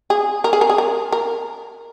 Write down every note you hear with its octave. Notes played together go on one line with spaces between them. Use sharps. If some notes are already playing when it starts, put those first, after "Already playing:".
G#4
A#4
G#4
A#4
G#4
A#4
A#4